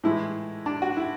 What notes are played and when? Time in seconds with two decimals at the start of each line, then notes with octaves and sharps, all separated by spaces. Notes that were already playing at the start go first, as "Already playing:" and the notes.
0.04 A2 E3 G#3 E4
0.66 D4
0.82 F#4
0.97 E4